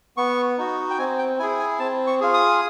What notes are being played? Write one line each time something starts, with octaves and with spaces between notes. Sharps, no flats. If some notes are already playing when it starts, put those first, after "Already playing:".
B3 C#6
D#4 F#4
G5
C4 G#5
G5
E4 G#4 G#5
G#5
C4 A5
C#6
F4 G#4
D#6